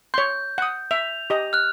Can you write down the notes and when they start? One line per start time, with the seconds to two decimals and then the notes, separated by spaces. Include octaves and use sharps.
0.14 C#5 C6 G6
0.58 F#5 D#6
0.91 E5 F7
1.30 G4 D#5
1.53 F6 F#6